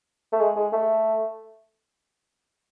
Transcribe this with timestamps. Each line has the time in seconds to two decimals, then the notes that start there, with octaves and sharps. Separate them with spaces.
0.32 A3
0.40 G#3
0.56 G#3
0.72 A3